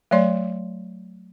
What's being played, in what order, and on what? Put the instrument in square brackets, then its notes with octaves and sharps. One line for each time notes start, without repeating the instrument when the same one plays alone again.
[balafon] F#3 A3 C#5 D5 C6